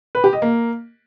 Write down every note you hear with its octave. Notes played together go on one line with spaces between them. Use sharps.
B4
G4
D#5
A#3